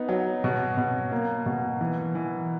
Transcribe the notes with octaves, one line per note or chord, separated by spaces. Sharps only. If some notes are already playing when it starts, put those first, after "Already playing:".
Already playing: B3 D#4
F#3
B2
B2
A#3
B2
E3
E3